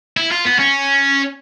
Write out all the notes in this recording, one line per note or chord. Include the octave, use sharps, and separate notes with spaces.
E4
F4
B3
C#4